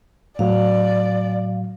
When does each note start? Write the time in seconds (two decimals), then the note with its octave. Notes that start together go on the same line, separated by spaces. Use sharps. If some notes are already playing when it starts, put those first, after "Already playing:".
0.39 A2 F#3 D5 F5